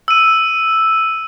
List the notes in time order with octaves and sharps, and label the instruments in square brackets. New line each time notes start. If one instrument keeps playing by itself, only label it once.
[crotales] E6 D#7